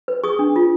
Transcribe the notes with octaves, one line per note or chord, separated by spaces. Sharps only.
B4
G#4 C#6 D#6
D4
F4